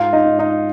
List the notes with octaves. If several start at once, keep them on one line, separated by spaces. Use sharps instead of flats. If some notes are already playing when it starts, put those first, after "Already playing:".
Already playing: G#2 F4 F5
D#4 D#5
G#2
D#4 D#5